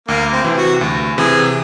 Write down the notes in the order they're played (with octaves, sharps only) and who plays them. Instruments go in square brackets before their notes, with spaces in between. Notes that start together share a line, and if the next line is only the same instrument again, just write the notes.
[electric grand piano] D2 [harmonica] A#3
[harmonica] C4
[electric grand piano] C3 E3
[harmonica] F#4
[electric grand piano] D2
[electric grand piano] C3 E3 [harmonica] G#4